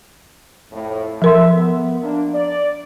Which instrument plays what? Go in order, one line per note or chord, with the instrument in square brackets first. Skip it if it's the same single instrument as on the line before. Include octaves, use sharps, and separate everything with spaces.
[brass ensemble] F2 A2
[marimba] F3 A#4 C6 [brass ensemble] A4 E5
[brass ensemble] B3
A#3 D4
D5